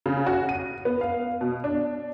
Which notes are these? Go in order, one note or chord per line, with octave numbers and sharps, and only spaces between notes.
C#3
F#4
D#7
B3
F5
B2
D4